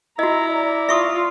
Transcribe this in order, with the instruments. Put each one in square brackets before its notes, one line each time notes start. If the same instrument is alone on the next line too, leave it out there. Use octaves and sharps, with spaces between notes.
[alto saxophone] E4 [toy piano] F#4 D#5 [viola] A#5
[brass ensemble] D5
[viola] F4 [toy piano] E5 C#6 D#6